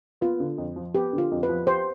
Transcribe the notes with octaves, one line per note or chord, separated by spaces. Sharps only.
B3 F4
D3
F2
F3
B3 G4
D3
F4
F2
B4
F3
G4 C5